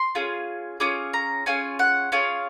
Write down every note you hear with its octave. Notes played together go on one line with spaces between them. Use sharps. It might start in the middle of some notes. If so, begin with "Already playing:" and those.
Already playing: C6
C#4 F4 G#4
C#4 F4 G#4 D6
A#5
C#4 F4 G#4 G#5
F#5
C#4 F4 G#4 F5